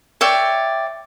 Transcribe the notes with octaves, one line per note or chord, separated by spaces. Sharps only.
C#5 D5 E5 G5